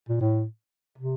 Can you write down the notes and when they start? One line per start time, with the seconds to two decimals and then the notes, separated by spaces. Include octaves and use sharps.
0.09 A#2
0.21 A2
0.98 C3